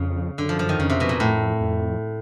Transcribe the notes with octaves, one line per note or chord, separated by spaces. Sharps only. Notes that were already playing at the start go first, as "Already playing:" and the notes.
Already playing: F2 C#3
F#2 D3
F3
F3
D#3
F2 C#3
C3
B2
A#2
A2
F2